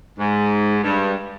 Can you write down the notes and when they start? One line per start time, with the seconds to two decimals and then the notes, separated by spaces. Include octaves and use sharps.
0.18 G#2
0.84 G2